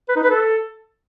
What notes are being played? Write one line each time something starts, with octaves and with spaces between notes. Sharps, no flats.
B4
D#4
B4
A4